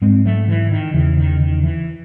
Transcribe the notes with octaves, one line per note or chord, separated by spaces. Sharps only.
G#2 G#3 C4
F#3 A3
E3
D#3
E2 C#3 E3
D#3
D#3
E3